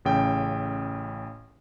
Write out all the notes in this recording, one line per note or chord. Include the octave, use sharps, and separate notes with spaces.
A1 C#3 G5